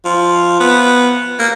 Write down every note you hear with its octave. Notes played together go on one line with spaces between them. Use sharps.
F3
B3
A#3